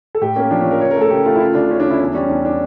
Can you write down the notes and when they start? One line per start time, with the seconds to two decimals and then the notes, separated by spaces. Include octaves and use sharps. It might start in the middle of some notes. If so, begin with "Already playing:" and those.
0.15 A4
0.21 A2 G4
0.36 A#3 C#4
0.51 F3 D4
0.61 F3 C#4
0.71 A#4
0.81 C#3 C#5
0.91 A#4
0.96 A3
1.01 A4
1.11 C#3 G4
1.25 A3 F4
1.35 E4
1.40 C#3 F4
1.55 D2 D4
1.70 D2 C#4
1.80 C#3 D4
1.90 E4
2.00 E2 D4
2.14 G3 C#4
2.29 E2 D4
2.45 D4